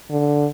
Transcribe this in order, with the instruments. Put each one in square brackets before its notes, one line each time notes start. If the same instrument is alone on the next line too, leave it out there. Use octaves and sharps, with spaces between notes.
[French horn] D3